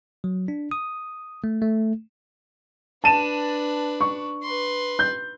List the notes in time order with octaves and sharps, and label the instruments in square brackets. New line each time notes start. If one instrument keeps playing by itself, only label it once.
[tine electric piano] F#3
D4
D#6
A3
A3
[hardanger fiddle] D4 B4 [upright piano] A5 D#7 E7
[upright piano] C#6
[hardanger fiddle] B4 C6
[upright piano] G6